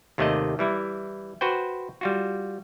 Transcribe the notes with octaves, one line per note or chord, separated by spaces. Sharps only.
D#2 C3 D#3 A3 D5 D#5
E3 G3 E4
F#4 B4 C5 G5
G3 F4 F#4